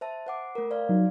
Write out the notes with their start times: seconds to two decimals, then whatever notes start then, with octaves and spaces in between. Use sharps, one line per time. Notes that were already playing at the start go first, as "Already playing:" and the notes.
0.01 C5 E5 A5
0.27 C5 F#5 D6
0.55 A3 A#4
0.70 C5 D5 F5
0.89 F#3 D#4